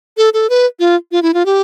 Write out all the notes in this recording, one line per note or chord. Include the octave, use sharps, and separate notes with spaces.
A4
A4
B4
F4
F4
E4
F4
G4